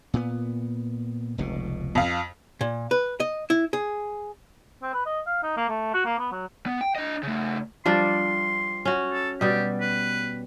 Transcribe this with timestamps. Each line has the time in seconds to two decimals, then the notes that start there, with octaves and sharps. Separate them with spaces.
0.14 A#2 B3
1.38 F1 C#2 B2
1.95 F2 F5
2.61 A#2
2.91 B4
3.20 D#5
3.50 E4
3.73 G#4
4.82 C4
4.93 B4
5.06 D#5
5.27 F5
5.43 D#4
5.57 A#3
5.69 A3
5.94 F#4
6.05 A#3
6.19 B3
6.32 F#3
6.66 B3
6.81 G5
6.96 D4 D#5
7.23 C#3 A3
7.85 F3 G3 D4 C6
8.85 C#4 F#4
9.12 A4
9.41 B2 G3 G4
9.81 B4